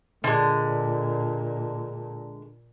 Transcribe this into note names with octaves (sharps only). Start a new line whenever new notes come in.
A#2 D3 G#3